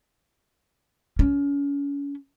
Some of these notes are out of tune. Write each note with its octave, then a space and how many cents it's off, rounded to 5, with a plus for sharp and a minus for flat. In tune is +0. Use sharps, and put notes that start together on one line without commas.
C#4 +35